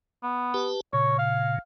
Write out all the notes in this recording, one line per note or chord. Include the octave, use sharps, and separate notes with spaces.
B3
G4 B4 A5
A#2 C#3 C#5
F5